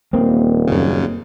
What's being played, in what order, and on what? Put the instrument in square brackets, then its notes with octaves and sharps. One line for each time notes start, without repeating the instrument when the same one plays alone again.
[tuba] D#1 [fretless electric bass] A#3 C4
[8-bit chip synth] F#2 C#3